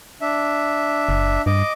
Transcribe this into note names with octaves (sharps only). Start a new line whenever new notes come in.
D4 E5
F#1
G2 D#5 D6